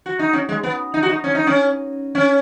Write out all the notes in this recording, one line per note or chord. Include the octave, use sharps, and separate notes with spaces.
F#4
D#4
C#4
G#3
B3
D#4
F#4
D#4
C#4
D#4
C#4
C#4